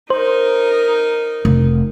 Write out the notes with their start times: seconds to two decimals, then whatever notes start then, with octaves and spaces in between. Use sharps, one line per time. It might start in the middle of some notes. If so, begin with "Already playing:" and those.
0.10 D#4 A#4 C5
1.45 F1